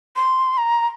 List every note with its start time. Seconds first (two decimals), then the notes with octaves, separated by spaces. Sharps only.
0.16 C6
0.58 A#5